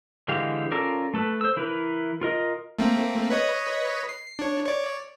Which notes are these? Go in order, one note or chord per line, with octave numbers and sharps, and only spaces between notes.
D3 E3 G#3 G4 F5
C#4 F4 A4 A#4 D5
A3 A4 B4
C5 E6
E3 E4 A#4 B4
F4 A#4 D#5
A3 A#3 C4
B4 C#5 D#5
C7
D4 C#5
C#5 D5